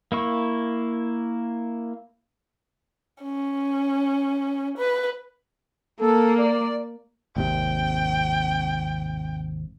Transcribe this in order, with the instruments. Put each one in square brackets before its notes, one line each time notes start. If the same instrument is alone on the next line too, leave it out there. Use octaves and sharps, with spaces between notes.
[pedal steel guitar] A#3 E4 C#6
[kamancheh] C#4
B4
[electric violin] A#3 [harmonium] A4
[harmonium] D5
[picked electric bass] G#1 D#2 C3 [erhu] G5